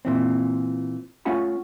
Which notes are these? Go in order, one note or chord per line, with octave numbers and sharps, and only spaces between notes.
A#2 E3 C4
A3 C#4 F4 F#5 G#5 B5